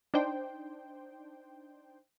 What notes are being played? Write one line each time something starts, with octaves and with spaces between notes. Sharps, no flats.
D4 D#4 C5 G5